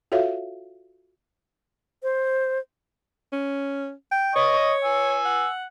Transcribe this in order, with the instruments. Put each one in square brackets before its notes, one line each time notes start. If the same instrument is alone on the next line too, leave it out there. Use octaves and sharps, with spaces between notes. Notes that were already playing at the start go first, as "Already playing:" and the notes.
[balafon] F4 F#4 A4 C#5 E5 F5
[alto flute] C5
[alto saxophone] C#4
G5
[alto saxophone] C#5 [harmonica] D#5 C#6 D#6
[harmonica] G#5 E6
[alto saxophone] F#5